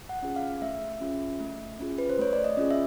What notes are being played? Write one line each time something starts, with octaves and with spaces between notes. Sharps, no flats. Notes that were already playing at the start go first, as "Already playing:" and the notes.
F#5
C#4 F4 G#4
F5
A3 E5
C#4 F4 G#4
A3
C#4 F4 G#4
B4
C5
A3 C#5
D5
D#5
C#4 F4 G#4
E5